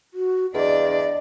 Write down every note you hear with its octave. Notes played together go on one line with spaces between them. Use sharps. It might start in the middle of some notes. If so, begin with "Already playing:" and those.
F#4
E2 D4 D5 D#5